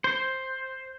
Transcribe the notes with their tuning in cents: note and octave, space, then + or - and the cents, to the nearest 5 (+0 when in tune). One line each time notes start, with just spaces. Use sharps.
C5 +5